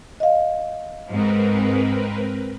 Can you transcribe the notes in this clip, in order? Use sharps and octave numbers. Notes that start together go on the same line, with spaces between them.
D#5 F5
G#2 C4 A#4 B4